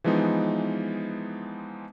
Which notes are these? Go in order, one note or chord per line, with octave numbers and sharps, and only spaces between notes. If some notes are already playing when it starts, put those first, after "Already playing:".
E3 F3 G#3 B3 D#4